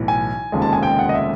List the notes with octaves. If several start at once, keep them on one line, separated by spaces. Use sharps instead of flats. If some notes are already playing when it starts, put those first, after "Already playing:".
Already playing: B1 A2 E3
G#5
F1 D#2 C#3 F3 G#3
A5
G#5
G5
F#5
D#5
E5